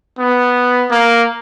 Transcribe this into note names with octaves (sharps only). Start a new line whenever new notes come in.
B3
A#3